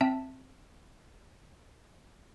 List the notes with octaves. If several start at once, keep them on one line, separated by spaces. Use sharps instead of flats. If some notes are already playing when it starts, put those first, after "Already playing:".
C4 E5 A5